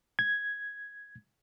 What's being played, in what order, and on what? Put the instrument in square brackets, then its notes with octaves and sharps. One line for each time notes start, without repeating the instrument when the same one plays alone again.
[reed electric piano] G#6